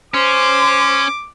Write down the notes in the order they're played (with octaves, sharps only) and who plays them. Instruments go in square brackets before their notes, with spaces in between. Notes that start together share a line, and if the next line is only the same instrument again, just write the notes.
[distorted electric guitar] C#4 [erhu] C5 [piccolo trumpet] D6